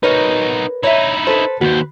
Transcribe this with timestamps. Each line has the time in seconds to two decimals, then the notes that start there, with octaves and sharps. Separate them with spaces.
0.03 D#4 F#4 A#4 B4 C#5
0.83 D#4 E4 C#5 E5
1.27 A4 B4 C5
1.61 D#2 F#4 B4 C5